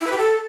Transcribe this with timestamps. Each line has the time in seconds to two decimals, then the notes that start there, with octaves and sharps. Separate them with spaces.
0.01 E4
0.07 B4
0.12 G4
0.18 A4